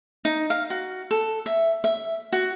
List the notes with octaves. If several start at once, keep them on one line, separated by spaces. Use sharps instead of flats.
D#4
F5
F#4
A4
E5
E5
F#4